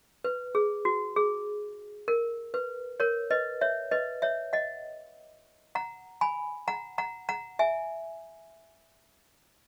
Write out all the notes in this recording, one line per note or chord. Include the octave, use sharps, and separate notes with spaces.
B4
G#4
F#4
G#4
A#4
B4
A#4 C#5
B4 D#5
C#5 E5
B4 D#5
C#5 E5
D#5 F#5
F#5 A#5
G#5 B5
F#5 A#5
F#5 A#5
F#5 A#5
E5 G#5